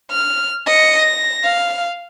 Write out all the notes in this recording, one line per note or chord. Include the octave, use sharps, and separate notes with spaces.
F6
D#5 C#7
A#6
F5